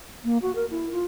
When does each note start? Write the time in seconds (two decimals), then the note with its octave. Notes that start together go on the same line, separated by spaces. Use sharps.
0.24 A#3
0.42 F#4
0.55 A#4
0.71 E4
0.92 F4